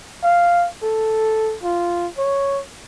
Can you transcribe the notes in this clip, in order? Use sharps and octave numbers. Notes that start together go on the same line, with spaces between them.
F5
A4
F4
C#5